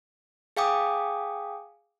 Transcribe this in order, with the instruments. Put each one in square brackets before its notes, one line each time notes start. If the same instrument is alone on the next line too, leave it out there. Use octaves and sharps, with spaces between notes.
[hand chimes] G#4 F5 G5 G#5 D6 D#6